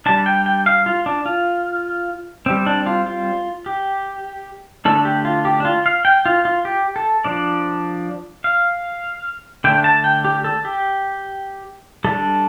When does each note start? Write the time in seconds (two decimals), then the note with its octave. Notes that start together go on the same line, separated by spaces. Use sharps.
0.06 G3 D4 A5
0.26 G5
0.46 G5
0.66 F5
0.86 F4
1.06 D4
1.26 F4
2.46 G3 C4
2.66 D4
2.86 F4
3.06 F4
3.66 G4
4.85 D3 A3 D4 A4
5.05 G4
5.25 F4
5.45 G4
5.60 D4
5.65 F4
5.86 F5
6.05 G5
6.26 F4
6.45 F4
6.65 G4
6.96 A4
7.24 F3 D4 D5
8.44 F5
9.64 D3 A3 D4 G5
9.84 A5
10.04 G5
10.25 G4
10.44 A4
10.65 G4
12.04 G3 D4 A4